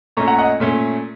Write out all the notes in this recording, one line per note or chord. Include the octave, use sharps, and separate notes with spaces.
A#2 A3 C#4 A#5 C#6
F#5 A#5
D#5 F#5
A#2 A3 C#4